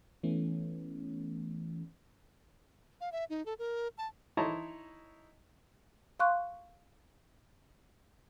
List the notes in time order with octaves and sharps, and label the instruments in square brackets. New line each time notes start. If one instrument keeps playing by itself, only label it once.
[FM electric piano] E3 A3 B3 C#4
[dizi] F5
E5
D#4
A4
A#4
A5
[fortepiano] D#4 E4 C#5 A5 A#5 C6
[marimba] F5 C6 C#6 F#6